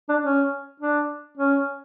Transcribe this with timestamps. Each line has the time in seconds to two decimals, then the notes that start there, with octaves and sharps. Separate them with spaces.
0.09 D4
0.23 C#4
0.80 D4
1.38 C#4